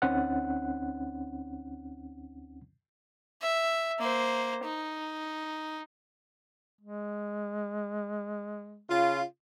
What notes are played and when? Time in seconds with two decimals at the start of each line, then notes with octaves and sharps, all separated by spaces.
0.02 D2 C4 C#4 D#4 F#5 F#6
3.41 E5
3.99 A#3 C5
4.64 D#4
6.81 G#3
8.89 C#3 F4